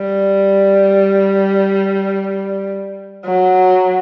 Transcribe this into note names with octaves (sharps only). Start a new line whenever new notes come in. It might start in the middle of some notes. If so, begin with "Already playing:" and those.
Already playing: G3
F#3